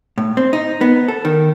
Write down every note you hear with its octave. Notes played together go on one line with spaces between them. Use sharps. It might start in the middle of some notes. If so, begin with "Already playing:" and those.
A2
C4
D#4
B3
A4
D#3